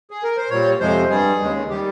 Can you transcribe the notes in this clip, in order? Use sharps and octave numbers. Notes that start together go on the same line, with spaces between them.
G#4
A#4
C5
A#2 G3 C#5
F2 C3 F3 G#3 C5
G2 G3 G#4
D#2 C#3 G#3
D#3 G3 G4